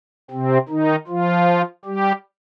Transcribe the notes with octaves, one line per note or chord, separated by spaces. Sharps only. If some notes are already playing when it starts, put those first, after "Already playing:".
C3 C4
D#3 D#4
F3 F4
G3 G4